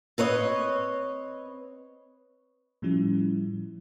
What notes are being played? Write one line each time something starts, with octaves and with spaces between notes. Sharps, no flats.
C4 B4 C#5 D#5
A2 F3 G3 C#4 E4